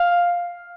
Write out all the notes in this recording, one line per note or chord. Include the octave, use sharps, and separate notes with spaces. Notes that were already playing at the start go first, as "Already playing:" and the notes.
Already playing: F5